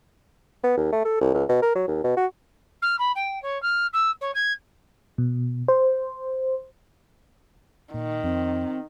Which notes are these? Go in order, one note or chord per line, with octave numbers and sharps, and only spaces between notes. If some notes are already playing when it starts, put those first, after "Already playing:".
B3
D#2
A3
A4
C2
C#2
B2
A#4
F#3
D#2
B2
F#4
F6
B5
G5
C#5
F6
E6
C#5
G#6
B2
C5
A#2 D#3
F2 C4